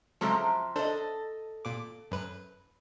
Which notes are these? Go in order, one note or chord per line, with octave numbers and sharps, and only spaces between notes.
C3 F3 F#3 G#3 C4 A4
D4 A4 C5 D#5
A#2 D6
F#2 B4